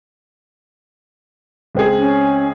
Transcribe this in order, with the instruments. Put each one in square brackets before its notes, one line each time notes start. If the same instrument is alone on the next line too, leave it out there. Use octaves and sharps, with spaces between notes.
[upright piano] C#2 C4 G#4
[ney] C#4